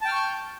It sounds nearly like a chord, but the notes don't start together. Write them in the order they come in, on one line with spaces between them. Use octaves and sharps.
A5 G5 F6 C#6 G6